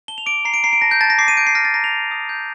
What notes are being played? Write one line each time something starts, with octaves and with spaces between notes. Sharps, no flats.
A5 G7
F7
D6 D7
A#5 C7
D7
A#5 C7
D7
A5 A#6
G6
A5 A6
A#6
D6 C7
D#7
G6 D7
C7
F6 A#6
A6
A#5 A#6
F7
A5
D#6
G6